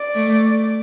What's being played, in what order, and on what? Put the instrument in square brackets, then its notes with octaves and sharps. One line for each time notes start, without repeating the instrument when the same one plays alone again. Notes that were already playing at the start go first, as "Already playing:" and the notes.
Already playing: [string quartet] D5
[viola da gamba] A3